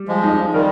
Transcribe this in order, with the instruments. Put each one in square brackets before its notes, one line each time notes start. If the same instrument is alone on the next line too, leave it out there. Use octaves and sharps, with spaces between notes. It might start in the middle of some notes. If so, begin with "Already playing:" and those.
Already playing: [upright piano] G3
[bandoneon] F3 G#3
[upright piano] D#4
[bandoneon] D#3 G3 [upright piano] A#4